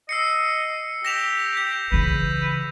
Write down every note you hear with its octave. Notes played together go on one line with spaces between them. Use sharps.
D#5 E6 C7 C#7
G4 A#6 E7 F7
G6
C#3 E3 B4